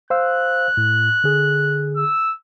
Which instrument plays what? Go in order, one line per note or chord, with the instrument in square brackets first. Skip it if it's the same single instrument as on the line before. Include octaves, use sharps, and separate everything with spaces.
[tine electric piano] C5 F5 E6 [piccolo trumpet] F#6
[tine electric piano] A2
D3 G#4
[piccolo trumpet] E6